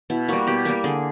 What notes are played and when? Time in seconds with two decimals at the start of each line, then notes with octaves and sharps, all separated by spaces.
0.10 B2 E4
0.28 G3 A#3 F#4
0.47 B2 G4
0.65 G3 A#3
0.84 D3 G#4